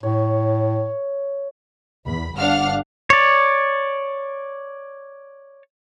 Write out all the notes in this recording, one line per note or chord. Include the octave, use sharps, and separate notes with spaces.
A2 C#5
E2 B5
G1 D4 F5 F#5 F6
C#5 D5